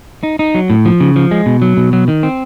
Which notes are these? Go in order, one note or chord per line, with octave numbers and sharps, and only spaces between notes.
D#4
D#4
F#3
A2
F3
C#3
F3
G#3
B2
F#3
B2
F#3
D#3
C4